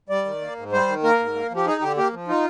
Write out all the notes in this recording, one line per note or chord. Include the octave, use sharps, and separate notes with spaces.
G3 D5
D#3
A#3
G#2
G3 C5
D#3
A#3 A#4
G#2
A#3
F3
G4
D#4 G#4
D3 G4
A#3 G4
F3
D#4 F4